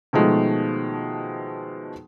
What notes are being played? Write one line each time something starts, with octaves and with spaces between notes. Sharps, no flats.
B2 D#3 F3 G#3 A3